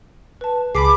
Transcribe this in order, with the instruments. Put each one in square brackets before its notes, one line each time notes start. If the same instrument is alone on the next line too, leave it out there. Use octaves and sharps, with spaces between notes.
[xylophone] B4 A5
[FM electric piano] C#2 G#4 [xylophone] B5 B6 C7 [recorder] D6